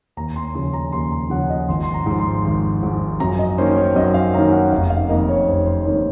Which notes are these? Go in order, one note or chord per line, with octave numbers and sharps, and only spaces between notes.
D#2 A#5
C6
C#3 F3 C6
A#5
D#2 C6
A#5
C#3 F3 F#5
D#5
G#1 C6
C6
A#5
G#2
F3
C6
G#1
G#2 F3
F#2 A#5
D#5
D#3 A#3 C#4 C5
C#5
F#2 D#5
F5
D#3 A#3 C#4 A#5
F#5
F1 F5
F5
F2 D#3 A#3 D#5
C#5
F1 C5
C5
F2 D#3 A#3 C#5